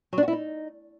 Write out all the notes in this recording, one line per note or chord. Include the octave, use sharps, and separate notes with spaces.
F#3
D4
F#4
E4
D#4